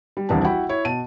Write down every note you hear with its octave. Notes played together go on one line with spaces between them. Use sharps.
G3
D#1 C2 E3 C4 D4 A5
E4 F#4 F#5 G5 B5
E4 C#5
B2 A5 D#7